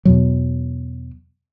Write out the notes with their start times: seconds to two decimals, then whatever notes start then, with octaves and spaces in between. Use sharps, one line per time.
0.05 E2 B2 F#3